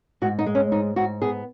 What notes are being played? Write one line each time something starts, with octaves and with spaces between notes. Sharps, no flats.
G#2 F#4
D#4
G#3
C#4
G#2 D#4
G#2 F#4
B3 G#4